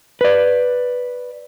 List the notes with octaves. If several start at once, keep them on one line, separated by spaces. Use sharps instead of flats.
B4 D5